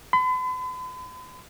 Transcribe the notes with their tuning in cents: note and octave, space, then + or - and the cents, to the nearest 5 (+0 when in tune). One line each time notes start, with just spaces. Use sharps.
B5 +45